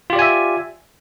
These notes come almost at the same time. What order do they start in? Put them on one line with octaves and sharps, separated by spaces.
F4 G4 D5 G#5 E5